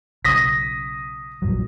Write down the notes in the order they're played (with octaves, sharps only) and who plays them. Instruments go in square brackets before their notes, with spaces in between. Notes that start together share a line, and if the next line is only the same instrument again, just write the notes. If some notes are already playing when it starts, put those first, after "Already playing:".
[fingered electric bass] B1 C#3 [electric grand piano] D#6 A#6 B6
[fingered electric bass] A#1 G2 F#3